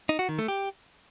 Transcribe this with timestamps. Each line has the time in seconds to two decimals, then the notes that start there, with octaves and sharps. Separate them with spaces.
0.09 D#4
0.19 F#4
0.29 D#3
0.39 A3
0.48 G4